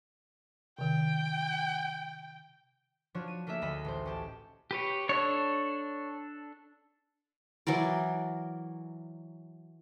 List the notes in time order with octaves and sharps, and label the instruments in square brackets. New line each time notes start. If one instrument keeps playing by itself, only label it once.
[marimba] C3 D#3 [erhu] G5
[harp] F3 D4 F#4 C#5
D#7
A3 A#3 D4 G#4 E5
D2 D#5 B5
A1 C5
C#4 G4 A5
[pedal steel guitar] G4 B4 C#5
[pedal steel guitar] D4 A4 [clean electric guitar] C#5
[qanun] E3 F#3 A#4 D5